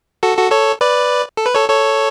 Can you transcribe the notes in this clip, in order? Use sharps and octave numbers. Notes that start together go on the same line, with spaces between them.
F#4 A4
F#4 A4
A4 C#5
B4 D5
A4
B4
A4 C#5
A4 C#5